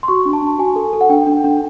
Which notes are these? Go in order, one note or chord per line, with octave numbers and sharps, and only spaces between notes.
C6
F#4 C#6
D4
A5
D4
F#4 G#5
A4
A4
F#5
D4 G5
D4
D4